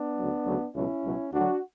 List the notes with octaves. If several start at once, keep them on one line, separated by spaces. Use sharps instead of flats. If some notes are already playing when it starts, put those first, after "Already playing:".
Already playing: B3 D4
D2 C#3 F#3
D2 C#3 F#3
C#2 B2 F#3 C#4 E4
C#2 B2 F#3
D2 D3 F#3 D4 F#4